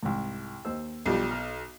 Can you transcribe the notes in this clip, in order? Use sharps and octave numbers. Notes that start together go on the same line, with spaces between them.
C2 G#2
D#2 C5 E6
B1 F3 G3 G4
F6